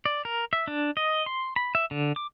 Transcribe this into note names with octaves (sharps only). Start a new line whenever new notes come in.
D5
A#4
E5
D4
D#5
C6
B5
E5
D3
D6